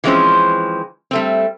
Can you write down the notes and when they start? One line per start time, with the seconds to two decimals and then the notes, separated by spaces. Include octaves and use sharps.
0.04 E3 F3 G#3 C4 C#4 C5
1.11 G3 A3 C4